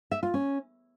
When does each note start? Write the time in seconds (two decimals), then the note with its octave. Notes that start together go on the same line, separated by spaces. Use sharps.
0.11 E5
0.23 F4
0.34 C#4